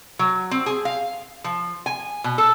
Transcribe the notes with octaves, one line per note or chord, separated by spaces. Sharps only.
F#3
C4
G#4
F5
F3
G#5
B2
A4